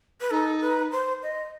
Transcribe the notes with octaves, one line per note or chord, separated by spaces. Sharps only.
B4
D#4 A4
B4
C5
D#5